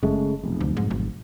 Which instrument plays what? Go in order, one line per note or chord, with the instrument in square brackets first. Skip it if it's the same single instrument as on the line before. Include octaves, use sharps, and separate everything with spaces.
[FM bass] F#1 [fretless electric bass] C#3 G#3 A3
[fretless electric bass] F1 B1
[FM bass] D2
G#2
G#1